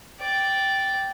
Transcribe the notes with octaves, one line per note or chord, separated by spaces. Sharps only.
D5 G5